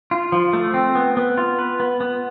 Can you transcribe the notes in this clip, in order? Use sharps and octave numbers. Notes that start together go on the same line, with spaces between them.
F4
F3
A3
C4
B3
B3
F4
B4
B3
B3